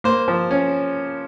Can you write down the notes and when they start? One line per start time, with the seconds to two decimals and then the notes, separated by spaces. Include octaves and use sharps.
0.04 A#3 C5
0.28 F3
0.51 C#4